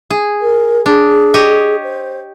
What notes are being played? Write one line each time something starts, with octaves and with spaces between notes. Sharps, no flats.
G#4
A#4
D4 G#4
G4 C#5 D#5
C5